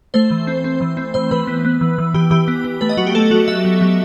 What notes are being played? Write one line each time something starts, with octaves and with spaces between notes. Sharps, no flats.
A3 C5
E3
C4
C4
E3
C4
E3 C5
E3 B4
B3
B3
E3
E3
E3 G4
E3 G4
B3
B3
A3 B4
D#5
F#3 F#4
G4
A3 A4
F#3 F#4
F#3 E5
F#3
F#3